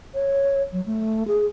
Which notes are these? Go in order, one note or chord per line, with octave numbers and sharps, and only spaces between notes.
C#5
F#3
A3
G#4